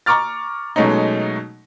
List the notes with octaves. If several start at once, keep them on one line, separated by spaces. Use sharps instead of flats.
A#5 C#6 D6 F6 A6
B2 F#3 G#3 A3 C#4 D#4